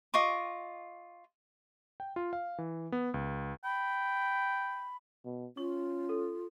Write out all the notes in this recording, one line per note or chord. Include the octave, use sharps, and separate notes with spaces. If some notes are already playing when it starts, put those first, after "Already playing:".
F4 D#5 C#6 D6
G5
F4
F5
E3
B3
C#2
G5 B5
B2
C#4 F4 C#6
A4